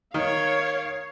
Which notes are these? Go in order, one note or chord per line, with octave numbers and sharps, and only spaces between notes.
D#3 C#5 F5